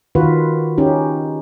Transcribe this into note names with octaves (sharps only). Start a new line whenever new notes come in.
D#3 F4 F#4 B4
C#4 D#4 G4